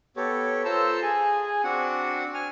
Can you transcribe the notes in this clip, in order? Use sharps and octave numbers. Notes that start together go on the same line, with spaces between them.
B3 G4 A4 C#5
F4 A4 C5 A5 A#5 E6
G#4 G#5
C4 D4 F#4 F#5
G#5 F6